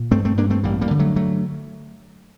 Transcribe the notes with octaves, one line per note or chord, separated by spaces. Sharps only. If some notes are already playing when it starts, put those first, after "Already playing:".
Already playing: A#2
G2 A3 C4
A3 C4
G2 A#3 D4
A3 C4
A1 G3 A#3
G3 A#3
D3
F#3 A3
F#3 A3